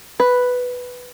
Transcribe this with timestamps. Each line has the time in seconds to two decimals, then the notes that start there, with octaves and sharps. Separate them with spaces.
0.20 B4